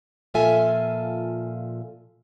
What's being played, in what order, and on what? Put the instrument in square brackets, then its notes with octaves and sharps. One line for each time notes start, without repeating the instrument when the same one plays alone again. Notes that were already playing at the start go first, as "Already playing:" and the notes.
[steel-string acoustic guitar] A#2 F3 F4 A4 E5 G#5